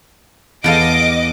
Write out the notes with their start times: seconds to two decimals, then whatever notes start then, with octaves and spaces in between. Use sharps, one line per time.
0.64 E2 A4 D#5 F5 D6